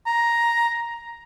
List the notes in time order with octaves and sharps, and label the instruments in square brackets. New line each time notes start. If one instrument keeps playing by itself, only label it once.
[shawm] A#5